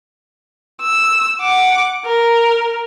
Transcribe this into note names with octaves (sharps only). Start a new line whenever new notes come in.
E6
F#5 D6
A#4